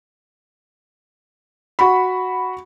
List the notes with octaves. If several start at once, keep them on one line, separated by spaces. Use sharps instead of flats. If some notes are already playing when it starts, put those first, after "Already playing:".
F#4 B5